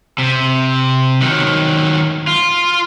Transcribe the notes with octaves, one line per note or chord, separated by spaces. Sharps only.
C3
D#3 F#3
F4